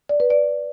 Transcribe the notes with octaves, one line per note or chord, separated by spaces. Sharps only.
D5
B4
D5